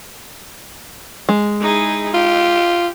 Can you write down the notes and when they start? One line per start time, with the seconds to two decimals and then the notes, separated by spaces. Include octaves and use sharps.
1.29 G#3
1.60 D#4 E4 G#4
2.14 F4 G4